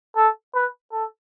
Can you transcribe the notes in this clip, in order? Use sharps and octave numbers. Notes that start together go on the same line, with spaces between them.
A4
B4
A4